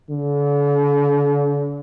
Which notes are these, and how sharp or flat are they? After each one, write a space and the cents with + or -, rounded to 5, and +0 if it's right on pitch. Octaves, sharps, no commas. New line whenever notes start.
D3 -40